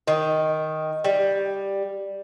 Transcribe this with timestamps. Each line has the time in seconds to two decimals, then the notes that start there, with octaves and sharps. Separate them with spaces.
0.07 D#3
1.04 G3